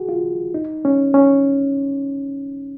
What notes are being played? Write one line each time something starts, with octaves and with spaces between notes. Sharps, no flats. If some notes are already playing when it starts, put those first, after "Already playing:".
Already playing: F#4 G#4
F4
D#4
C#4
C#4